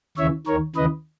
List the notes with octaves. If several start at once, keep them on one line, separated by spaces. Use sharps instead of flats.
D#2 C#3 E3 C#5 E5
D#2 D#3 A#4 C#5
D#2 C#3 E3 B4 D#5